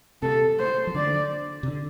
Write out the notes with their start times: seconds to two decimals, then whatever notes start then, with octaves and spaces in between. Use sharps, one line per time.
0.22 C3 A4
0.59 C5
0.87 F3
0.95 D3 D5
1.63 C3
1.68 D3